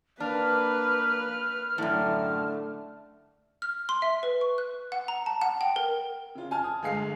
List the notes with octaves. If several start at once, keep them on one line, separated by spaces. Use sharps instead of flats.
A#3 D4 B4 F6
F#2 A2 D3 A3
F6
C6
E5
B4
C#6
F#6
F#5
A#5
A5
F#5
G5
A#4
C#3 F4
G#5 A5 F6
D#6
G1 G#3 F5 C7